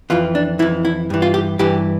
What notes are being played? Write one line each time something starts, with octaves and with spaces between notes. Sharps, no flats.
F2 E3 F4
D4
F2 E3 E4
E4
G2 E3
F4
G4
G2 E3 G4